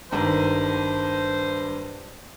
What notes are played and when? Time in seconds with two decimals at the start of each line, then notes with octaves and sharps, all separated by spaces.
0.11 G#1 G2 C5 A#5